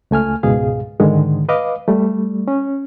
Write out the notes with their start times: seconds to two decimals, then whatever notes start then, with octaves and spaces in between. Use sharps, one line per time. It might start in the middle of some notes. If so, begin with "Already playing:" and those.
0.11 C#2 A3 G#5 F6
0.43 C#2 G#2 B2 G#4 F5
1.00 G#2 D3 D#3 G#3
1.49 B4 D#5 F5 D6
1.88 G3 A3
2.48 C#4